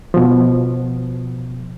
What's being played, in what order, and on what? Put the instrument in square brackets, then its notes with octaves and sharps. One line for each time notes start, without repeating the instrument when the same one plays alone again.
[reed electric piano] B2 F3